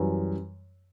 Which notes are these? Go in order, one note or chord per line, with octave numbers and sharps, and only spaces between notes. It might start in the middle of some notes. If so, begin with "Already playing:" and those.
Already playing: F#2 E3 G3